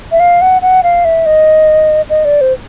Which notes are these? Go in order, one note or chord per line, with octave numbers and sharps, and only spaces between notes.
E5
F5
F#5
F#5
F5
E5
D#5
D#5
D5
C5